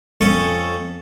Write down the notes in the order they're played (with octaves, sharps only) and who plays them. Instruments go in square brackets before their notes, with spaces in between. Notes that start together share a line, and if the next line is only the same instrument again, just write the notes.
[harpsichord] F2 C#4 A4 A5 C#6 D#6